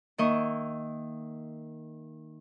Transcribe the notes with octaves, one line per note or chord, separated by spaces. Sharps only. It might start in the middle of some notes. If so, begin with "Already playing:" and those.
D#3 A#3 A#4 D#5 E5 C#6